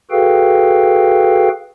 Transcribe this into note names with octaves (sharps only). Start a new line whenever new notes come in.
F#4 G#4 A4 B4 F5 G5